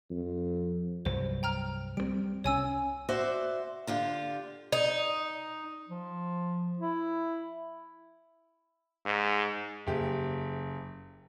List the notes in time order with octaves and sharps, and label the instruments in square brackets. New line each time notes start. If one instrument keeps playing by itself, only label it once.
[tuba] F2
[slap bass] C2 G2 F#3 [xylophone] C5
[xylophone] G5 A#5 F6
[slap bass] G3 A3 C4 [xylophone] D7
[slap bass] C2 C#4 [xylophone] C#5 G#5 E6
[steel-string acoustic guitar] F#4 C5 D5 E5
D3 F4 G4
[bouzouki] D#4
[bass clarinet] F3
E4
[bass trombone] G#2
[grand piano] F#1 G4